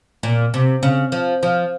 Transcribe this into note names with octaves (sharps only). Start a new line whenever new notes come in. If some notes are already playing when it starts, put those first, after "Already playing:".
A#2
C3
C#3
F3
F3